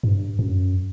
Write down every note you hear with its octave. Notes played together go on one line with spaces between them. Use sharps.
G2
F#2